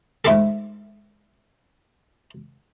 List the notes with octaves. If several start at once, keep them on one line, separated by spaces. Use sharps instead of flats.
G#2 A3 E4 F4 G4 A4